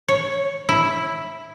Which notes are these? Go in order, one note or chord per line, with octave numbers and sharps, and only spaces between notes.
C#5
E4